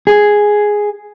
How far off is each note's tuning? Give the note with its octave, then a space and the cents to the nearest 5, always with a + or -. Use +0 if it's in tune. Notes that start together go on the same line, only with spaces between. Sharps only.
G#4 +0